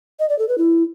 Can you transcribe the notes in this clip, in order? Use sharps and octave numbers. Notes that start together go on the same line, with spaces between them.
D#5
D5
A4
B4
E4